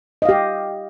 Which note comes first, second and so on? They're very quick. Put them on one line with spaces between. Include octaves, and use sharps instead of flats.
D#5 F5 G4